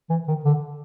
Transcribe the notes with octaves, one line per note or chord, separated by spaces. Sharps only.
E3
D#3
D3